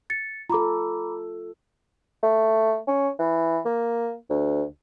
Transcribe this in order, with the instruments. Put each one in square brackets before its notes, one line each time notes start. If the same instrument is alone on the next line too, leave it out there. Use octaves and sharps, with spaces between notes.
[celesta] A6 C#7
[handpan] F4 A4 [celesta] A#5 B5 D6
[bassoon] A3
C#4
E3
A#3
D2